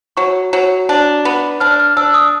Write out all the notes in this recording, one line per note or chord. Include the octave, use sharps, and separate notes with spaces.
F#3 C#6
F#3
D4
B3
D4 F6
F6
D4 E6
D#6